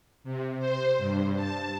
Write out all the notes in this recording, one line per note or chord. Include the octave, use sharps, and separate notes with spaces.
C3
C5
G2
A5